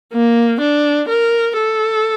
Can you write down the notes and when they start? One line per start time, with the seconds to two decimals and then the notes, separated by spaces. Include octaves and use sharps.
0.13 A#3
0.60 D4
1.08 A#4
1.57 A4